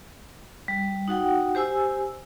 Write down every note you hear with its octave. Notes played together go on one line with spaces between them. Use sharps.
G3
D#4 F#4 F#5 G5
G4 C5 G#5 E6